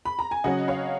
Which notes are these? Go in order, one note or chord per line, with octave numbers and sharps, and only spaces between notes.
B5
A#5
G#5
C#3 F#3 C#4 D#5 F#5
C#5 F5